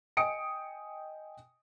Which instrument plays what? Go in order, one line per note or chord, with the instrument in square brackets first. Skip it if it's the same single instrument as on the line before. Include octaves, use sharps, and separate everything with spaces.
[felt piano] D#5 G5 G#5 D#6 C#7 D7